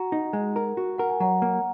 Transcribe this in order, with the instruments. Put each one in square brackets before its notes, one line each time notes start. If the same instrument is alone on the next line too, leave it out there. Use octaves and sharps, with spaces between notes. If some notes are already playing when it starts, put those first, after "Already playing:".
Already playing: [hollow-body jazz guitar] F#4 [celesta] F#5 A#5
[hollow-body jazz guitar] D#4
G#3
A#4
F#4
[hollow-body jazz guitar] A#4 [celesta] F#5
[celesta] G#5
[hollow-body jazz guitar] F#3 [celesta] F#5 A#5
[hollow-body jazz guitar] A#3